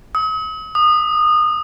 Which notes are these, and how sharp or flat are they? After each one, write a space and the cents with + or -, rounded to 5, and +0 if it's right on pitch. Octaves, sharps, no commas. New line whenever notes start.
D#6 +45
D#6 -25